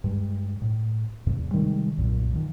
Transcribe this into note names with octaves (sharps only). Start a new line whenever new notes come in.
G2 G#3
A2
E2 G#2 C3 F3
C3 D#3 G3 G#3
B1 F#2 A#2
D#3 F3